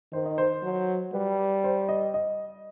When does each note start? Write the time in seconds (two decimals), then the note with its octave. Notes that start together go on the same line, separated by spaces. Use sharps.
0.12 D#3 C5
0.26 D#5
0.38 C5
0.63 F#3
1.13 G3 B4
1.64 C5
1.89 D#5
2.14 D#5